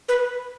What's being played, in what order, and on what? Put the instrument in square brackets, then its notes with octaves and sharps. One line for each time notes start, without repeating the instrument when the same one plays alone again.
[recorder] B4